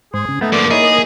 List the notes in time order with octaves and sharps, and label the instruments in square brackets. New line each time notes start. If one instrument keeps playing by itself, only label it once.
[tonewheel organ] G#2 C5 [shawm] G#4
[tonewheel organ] C#3
[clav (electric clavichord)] A3 B3 [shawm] D#4 [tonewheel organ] A5
[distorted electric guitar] G2 F3 [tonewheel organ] A#3 [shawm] D5
[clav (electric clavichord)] D#4 E4 C#5 [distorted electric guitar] G#4
[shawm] D#5